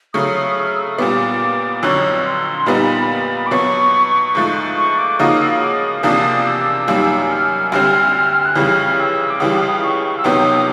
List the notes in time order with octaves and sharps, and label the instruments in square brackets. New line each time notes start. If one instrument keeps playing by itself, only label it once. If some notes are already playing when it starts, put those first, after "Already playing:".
[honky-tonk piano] C#3 F#3 A3 [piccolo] D#6
[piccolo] F6
E6
D#6
[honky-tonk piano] A#2 G3 B3 [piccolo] D6
[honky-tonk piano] F2 D3 F#3 [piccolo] C#6
[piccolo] C6
[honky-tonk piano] A#2 G3 B3 D#4 [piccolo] B5
[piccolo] B5
D6
[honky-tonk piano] B2 F#3 B3 [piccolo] C#6
[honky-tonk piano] G#2 F3 A3
[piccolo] C#6
D6
[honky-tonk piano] C#3 F3 A#3 D#4 F#4 [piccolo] D#6
[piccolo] E6
D#6
D6
D#6
[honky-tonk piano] E2 C3 F3 A#3 D4 [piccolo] D#6
[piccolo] E6
[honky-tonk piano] F#2 D#3 G3 A#3
[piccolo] F6
[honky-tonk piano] D2 D3 G3 C4 [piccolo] F6
[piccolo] F#6
[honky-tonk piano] F2 C#3 E3 G3 [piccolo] F6
[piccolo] E6
D6
[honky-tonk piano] C#2 C#3 E3 G3 [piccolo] D#6
[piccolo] C#6
E6
[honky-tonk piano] C#2 C3 D#3 F#3 B3 [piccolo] D#6